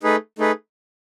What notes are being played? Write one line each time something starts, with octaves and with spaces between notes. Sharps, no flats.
A3 D#4 G#4 B4
A3 D#4 G#4 B4